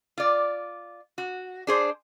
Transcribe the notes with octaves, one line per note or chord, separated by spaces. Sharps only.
F4 D5
F#4
D4 G#4 C5